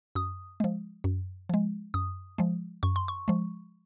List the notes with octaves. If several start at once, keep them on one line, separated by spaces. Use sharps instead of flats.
F#2 D#6
F3 G#3
F#2
F3 G#3
F#2 D#6
F3 G#3
F#2 C#6
C6
C#6
F3 G#3